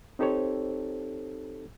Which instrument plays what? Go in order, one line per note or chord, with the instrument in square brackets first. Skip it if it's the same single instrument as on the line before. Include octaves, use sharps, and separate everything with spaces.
[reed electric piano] C4 D#4 G4 A4 C5 C#5